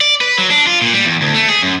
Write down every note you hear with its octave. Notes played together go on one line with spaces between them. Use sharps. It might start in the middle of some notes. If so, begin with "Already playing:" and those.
D5
B4
F#3
D4
F4
A#2
G3
E2
D2
A3
G#4
F#2